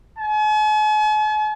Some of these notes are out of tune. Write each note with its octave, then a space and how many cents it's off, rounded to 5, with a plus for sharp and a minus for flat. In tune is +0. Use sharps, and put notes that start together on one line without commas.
G#5 +45